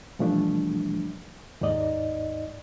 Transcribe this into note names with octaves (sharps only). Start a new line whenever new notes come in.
B2 E3 F3 G3 A3 D4
D#2 G#2 D#4 D5 D#5